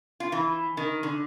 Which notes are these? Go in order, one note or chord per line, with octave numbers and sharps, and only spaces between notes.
F4
E3
D#3
D3